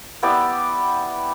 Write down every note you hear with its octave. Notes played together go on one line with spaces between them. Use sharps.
B3 E4 G4 D5